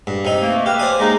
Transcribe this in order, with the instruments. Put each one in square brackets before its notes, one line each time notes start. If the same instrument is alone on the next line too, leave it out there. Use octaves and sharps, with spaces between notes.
[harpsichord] G2
C3 D#4
[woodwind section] A3 A#3
[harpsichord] G4 [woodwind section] B4 E5 F5
[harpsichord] C5 D5 G#5
[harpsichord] G#3 A#3 [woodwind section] D#4